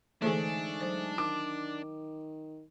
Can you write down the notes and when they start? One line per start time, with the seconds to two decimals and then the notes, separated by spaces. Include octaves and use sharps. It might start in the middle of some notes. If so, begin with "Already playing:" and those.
0.22 G#2 D3 E3 A3 D4 G#4 C5
0.81 F#3 C5
1.18 D#3 D6